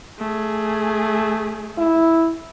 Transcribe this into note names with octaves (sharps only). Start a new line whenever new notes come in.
A3 G#4
E4